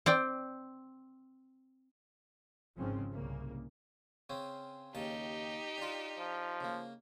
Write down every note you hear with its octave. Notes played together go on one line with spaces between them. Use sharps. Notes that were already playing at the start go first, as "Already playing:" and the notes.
C4 D5 G5
G#1 G#2 C#3 F3 C4 C#4
C2 C#3 A#3
C#3 C4 C#4
D#2 C#3 D#4 G4 A5
D4 F4
F3
C#3 A#3